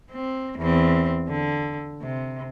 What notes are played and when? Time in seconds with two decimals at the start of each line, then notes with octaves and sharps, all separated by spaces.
0.12 C4
0.59 E2 C4
1.29 D3
2.01 C3